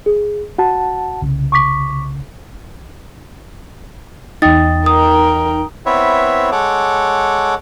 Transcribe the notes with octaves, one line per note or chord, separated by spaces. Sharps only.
G#4
F#4 F#5 A5
C2 C#3
C#6 D6 B6
E2 D#4 G5 D#6 A6
A#4 G5 D#6
B3 C4 E4 B4 C#5 E5
G#3 A4 C#5 F#5 D6